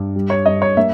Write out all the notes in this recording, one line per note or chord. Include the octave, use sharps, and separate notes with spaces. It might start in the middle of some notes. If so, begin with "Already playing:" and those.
Already playing: G2
G3
C#5
G2 D#5
C#5
A#3 E5